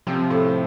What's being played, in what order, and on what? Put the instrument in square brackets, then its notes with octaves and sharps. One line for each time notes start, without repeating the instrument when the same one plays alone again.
[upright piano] C3 C4 [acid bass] F3
[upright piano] A2 A3